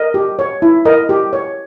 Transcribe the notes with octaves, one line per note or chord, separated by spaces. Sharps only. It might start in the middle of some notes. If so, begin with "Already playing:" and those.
Already playing: A#4 D#5
G4
C#5
E4
A#4 D#5
G4
C#5